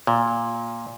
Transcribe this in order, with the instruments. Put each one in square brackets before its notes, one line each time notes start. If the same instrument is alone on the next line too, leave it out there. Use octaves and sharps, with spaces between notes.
[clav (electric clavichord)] A#2